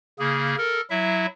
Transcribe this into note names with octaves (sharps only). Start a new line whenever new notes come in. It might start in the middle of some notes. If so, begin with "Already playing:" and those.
C#3 A#3 G#4
A4 A#4
F#3 E4 E5